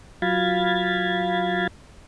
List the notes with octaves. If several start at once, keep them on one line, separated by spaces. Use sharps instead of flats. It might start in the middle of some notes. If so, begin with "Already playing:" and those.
F#3 F4 F5 B5 G#6 A6